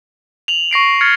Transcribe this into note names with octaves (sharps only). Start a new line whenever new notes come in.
F7 F#7
C#6 A#6 C7 D7
F6 G#6 A6 C7 C#7